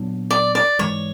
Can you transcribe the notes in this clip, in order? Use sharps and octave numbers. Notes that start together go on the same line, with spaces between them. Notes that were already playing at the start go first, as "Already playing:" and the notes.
Already playing: A#2 F#3 B3 D4
D5
D5
G#2 E3 G#3 C#5